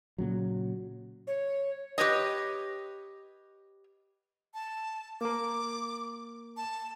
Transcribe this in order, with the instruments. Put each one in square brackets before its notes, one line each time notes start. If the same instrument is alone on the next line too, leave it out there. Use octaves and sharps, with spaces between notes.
[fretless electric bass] A#2 C#3 F#3
[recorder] C#5
[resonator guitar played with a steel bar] G4 B4 C#5 D#5
[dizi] A5
[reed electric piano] A#3 A#4 [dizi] D6
[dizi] A5